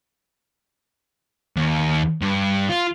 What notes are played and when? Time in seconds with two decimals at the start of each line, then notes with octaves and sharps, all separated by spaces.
1.56 D#2
2.21 G2
2.70 F4